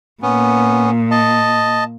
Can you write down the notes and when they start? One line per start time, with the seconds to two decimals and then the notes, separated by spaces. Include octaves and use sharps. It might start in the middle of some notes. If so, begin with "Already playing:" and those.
0.23 A#2 B3 C#4
1.11 D#5 A5